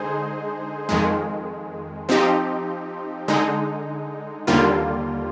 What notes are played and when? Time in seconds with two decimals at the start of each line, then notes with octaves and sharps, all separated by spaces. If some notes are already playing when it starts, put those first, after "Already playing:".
Already playing: D3 G#3 D#4 G#4 C5
0.89 F2 D#3 G#3
2.09 F3 C4 D#4 G4
3.28 D3 G#3 D#4
4.47 D#2 D3 G3 A#3 F4